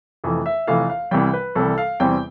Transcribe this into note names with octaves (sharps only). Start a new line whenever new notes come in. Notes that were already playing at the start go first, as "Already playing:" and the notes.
F1 F2 E3 A3
E5
F1 F2 E3 A3 F5
F5
C2 C3 E3 G3 G5
B4
C2 C3 E3 G3 A4
F5
E2 C3 E3 G3 C4 G5